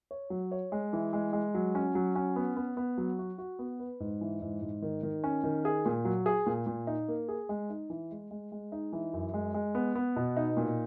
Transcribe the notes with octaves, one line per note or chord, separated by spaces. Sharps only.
C#5
F#3
C#5
G#3
E3
G#3
G#3
F#3
C#4
F#3
C#4
B3
B3
B3
F#3
F#4
F#4
B3
B4
G#2
E3
G#2
G#2
D#3
D#3
C#4
D#3
G#4
A#2
F#3
G#4
A#2
A#2
D#4
A#3
G#4
G#3
D#4
E3
G#3
G#3
G#3
D#4
E3
F#2
G#3
G#3
B3
B3
B2
D#4
A#2